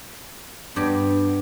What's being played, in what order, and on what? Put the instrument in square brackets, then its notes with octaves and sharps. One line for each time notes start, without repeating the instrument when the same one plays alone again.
[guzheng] G2 G4 D5 [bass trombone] B3